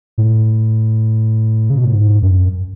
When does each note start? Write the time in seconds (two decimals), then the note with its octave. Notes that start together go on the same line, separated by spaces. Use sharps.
0.18 A2
1.70 C#3
1.78 B2
1.84 A2
1.93 G#2
2.22 F#2